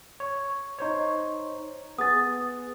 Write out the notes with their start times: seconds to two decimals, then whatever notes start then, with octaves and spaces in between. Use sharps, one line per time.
0.20 C#5
0.79 D#4 C5 C#5
1.99 B3 G#4 D#6 A6